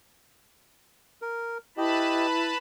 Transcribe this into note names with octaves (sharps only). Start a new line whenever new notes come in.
A#4
E4 G4 B4 D#5 A5 B5